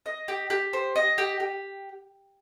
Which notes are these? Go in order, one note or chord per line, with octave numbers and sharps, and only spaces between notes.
D#5
G4
G4
C5
D#5
G4
G4